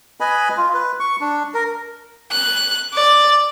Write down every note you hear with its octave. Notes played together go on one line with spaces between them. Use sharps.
B4 D#5 G#5 B5
F4
B4
C#6
D4
A#4
F#6
D5